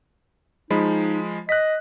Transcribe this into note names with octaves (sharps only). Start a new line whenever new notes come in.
F3 G#3 D#4 B5
D#5 F#6 B6